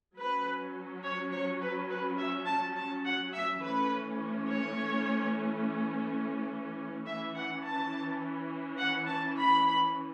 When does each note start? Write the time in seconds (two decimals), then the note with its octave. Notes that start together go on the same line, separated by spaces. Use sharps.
0.18 F#3 C#4 B4
1.04 C#5
1.33 C#5
1.61 B4
1.90 B4
2.19 E5
2.47 A5
2.76 A5
3.05 F#5
3.34 E5
3.62 E3 A3 C#4 B4
4.49 C#5
7.06 E3 C#4 E5
7.35 F#5
7.63 A5
8.78 F#5
9.07 A5
9.36 B5